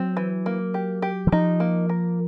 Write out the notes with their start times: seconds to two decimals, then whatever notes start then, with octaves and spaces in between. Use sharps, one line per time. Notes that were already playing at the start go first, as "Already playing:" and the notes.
Already playing: F#3 C4
0.17 E3
0.46 A#3
0.74 G4
1.02 G4
1.27 E3
1.32 F3 D#4
1.60 A#3
1.89 A#4